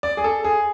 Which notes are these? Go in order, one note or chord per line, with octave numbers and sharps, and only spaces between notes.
D5
G#4
A4
G#4